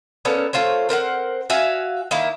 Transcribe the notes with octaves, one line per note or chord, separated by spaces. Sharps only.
A#3 B3 C#4 A4
A3 F4 C5 C#5
C4 A#4 C5 F#5
F#4 E5 F5 G#5
D#3 A#3 E4